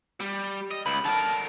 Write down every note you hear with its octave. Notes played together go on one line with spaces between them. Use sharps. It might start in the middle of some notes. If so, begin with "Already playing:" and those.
G3
D#5
C#2 B5
D3 A#4 A5